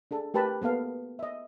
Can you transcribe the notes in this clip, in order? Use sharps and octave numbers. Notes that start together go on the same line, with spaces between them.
D4 G#4 A4
A3 G4 A#4 B4 A5 B5
A#3 B3 A4 F5
D#5 E5